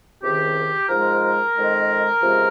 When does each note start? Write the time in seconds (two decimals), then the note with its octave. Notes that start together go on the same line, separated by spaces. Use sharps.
0.22 C#2 C3 D#3 G4
0.89 G#2 F3 G#3 A#4
1.55 F2 D#3 G#3
2.22 C#2 C3 F3 G#3